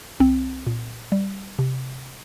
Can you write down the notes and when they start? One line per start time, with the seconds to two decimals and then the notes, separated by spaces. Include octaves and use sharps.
0.20 C2 C4
0.67 A#2
1.12 G3
1.59 C3